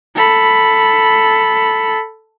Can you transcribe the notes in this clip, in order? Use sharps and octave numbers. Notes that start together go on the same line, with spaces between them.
A4 B5